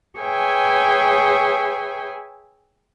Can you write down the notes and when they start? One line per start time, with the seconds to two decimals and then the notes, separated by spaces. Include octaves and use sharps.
0.19 G#4 B4 C#5 E5 G5 G#5